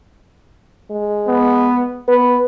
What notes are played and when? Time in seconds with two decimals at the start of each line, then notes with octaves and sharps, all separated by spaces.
0.91 G#3
1.27 B3
2.08 B3 B4